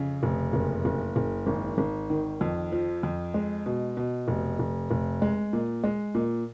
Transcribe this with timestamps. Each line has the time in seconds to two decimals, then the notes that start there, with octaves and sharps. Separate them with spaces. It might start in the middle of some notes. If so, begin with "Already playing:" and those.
Already playing: F2 C#3
0.23 F1
0.53 F#1
0.85 F#1
1.16 F#1
1.47 G#1
1.78 G#1
2.10 D#3
2.41 F2
2.72 F3
3.03 F2
3.34 G#3
3.66 B2
3.97 B2
4.28 F1
4.59 F1
4.91 F1
5.22 G#3
5.53 A#2
5.84 G#3
6.15 A#2